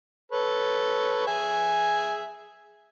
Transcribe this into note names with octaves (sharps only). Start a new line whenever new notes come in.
A4 B4 C#5
G#4 E5 G#5